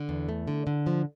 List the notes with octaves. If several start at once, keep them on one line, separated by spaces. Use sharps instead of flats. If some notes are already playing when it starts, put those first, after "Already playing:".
Already playing: D3
E2
A3
D3
D3
F3